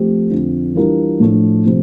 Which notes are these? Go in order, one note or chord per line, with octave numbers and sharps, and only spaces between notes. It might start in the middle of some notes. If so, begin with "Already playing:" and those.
Already playing: F3 A3 C4 G4
F2 D3 F3
E3 G3 D4 F4 A#4
A2 F3 A3 D4
C3 F3 A3 C4